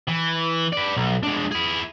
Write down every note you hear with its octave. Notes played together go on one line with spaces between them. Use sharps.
E3
B4 D5
B1
G#3 D4
E4 G#4